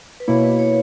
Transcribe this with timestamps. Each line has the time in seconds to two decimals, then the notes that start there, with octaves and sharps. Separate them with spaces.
0.20 B4
0.28 B2 A#3 E4 C#5
0.43 B4
0.59 C#5